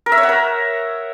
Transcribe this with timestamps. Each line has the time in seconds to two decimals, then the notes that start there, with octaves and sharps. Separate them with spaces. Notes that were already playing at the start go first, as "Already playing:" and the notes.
0.06 A#4
0.12 E5
0.18 C#5
0.23 F#5
0.29 A#4